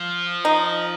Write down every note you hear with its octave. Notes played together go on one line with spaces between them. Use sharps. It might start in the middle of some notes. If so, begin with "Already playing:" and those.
Already playing: F3
D#4